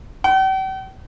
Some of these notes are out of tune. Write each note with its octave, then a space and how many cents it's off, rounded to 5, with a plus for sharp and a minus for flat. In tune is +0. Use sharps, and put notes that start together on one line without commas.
G5 -45